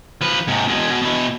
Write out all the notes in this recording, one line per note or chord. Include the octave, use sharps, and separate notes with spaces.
F3 B4
G#2 C3
B2 G#3
B2
B2 E4